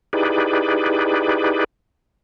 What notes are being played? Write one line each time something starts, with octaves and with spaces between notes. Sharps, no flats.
D#4 E4 G4 G#4 B4 D5